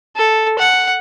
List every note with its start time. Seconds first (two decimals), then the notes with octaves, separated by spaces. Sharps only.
0.17 A4
0.59 F#5